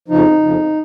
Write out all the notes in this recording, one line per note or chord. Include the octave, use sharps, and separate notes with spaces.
F2 C#3 F3 D#4
F2 C#3 F3